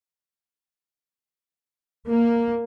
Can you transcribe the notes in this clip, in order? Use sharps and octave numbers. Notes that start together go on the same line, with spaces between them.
A#3